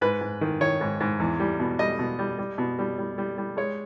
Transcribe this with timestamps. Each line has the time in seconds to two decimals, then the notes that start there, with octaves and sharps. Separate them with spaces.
0.01 G#2 B4
0.21 G#2
0.41 D#3
0.61 D#3 C#5
0.81 G#2
1.00 G#2
1.20 E2
1.40 G3
1.59 B2
1.79 G3 D#5
1.99 B2
2.19 G3
2.38 G3
2.58 B2
2.79 G3
2.98 G3
3.18 G3
3.38 G3
3.57 G#3 C#5